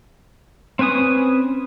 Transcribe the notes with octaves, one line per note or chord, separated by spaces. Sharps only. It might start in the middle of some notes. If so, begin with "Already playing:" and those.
C4 C#4 B4 G#5 D#6